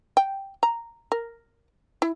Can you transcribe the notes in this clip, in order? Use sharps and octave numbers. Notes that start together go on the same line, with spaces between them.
G5
A#5
A#4
E4